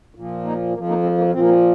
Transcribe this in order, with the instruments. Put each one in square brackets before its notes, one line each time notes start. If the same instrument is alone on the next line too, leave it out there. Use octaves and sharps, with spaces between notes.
[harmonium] A#2 F3
A#3 D#4
F2 F3 A#3
A#3 D#4
G#3 C4
A#3
A#2 F3 C4
A#3
G#3 C4